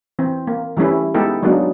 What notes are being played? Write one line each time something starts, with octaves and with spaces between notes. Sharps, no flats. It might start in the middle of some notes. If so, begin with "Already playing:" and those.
E3 C4
A#3
E3 G3 A3 C#4 E4
G#3 B3 D#4 E4 G4 A4
F#3 G#3 A#3 B3 D4 D#4